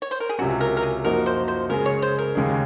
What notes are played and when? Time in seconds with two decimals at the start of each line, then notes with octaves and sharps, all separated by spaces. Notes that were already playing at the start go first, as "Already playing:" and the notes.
0.02 C#5
0.11 C5
0.20 A#4
0.29 G#4
0.39 C#2 C3 F#3 C#4 F#4
0.61 A#4
0.77 A#4
0.83 G#4
1.04 F#2 F3 A#3 D#4 F#4 A#4
1.26 C5
1.48 C5
1.69 C#3 G#3 C#4 G#4 A#4
1.86 C#5
2.02 C5
2.18 A#4
2.35 D#2 C#3 G#3 C#4 G#4